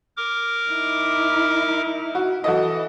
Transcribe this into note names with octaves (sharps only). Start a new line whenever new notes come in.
A#4 D6
D#4 E4
F#4
E3 F#4 A4 D#5